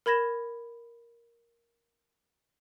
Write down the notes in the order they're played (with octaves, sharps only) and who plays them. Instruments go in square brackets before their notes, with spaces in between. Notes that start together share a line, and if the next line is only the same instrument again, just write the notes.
[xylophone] A#4 B5 G#6 A#6 E7